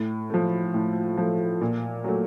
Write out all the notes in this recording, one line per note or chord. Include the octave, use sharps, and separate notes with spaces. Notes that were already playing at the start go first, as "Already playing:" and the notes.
Already playing: A2
F3 A3
A2
F3 A3
A#2
F#3 A3